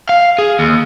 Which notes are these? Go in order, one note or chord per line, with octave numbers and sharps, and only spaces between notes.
F5
G#4
D#2